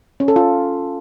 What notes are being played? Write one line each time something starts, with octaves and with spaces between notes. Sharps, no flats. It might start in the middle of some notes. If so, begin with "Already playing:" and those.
C#4
A4
F4